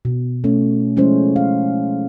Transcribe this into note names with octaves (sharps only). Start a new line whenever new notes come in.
B2
A3 C#4
F3 G#3 C#4 E4 C5
F5